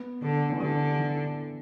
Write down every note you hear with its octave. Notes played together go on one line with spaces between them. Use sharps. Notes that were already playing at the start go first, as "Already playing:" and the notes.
Already playing: B3
D3
E3
D3 G3
E3